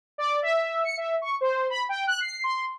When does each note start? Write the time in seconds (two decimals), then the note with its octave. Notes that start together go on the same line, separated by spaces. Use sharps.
0.18 D5
0.42 E5
0.85 C#7
0.97 E5
1.22 C#6
1.41 C5
1.70 B5
1.89 G5
2.07 F#6
2.21 C7
2.44 C6